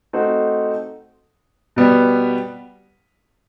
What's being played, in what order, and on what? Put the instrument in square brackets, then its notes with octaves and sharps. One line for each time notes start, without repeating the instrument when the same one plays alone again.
[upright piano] A3 C4 D#4 F#4
B2 G3 B3